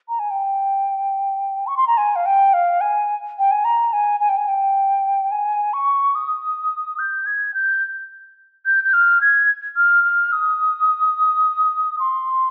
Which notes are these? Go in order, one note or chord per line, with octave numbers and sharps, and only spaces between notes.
A#5
G#5
G5
C#6
C6
A#5
G#5
F5
G5
F5
G#5
G5
G#5
A#5
G#5
G#5
G5
G#5
G5
G#5
C#6
D#6
G6
G#6
G6
G6
G6
F6
G#6
F6
F6
D#6
C6